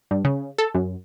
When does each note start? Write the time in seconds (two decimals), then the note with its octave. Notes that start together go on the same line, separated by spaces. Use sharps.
0.11 G2
0.25 C#3
0.58 A4
0.75 F#2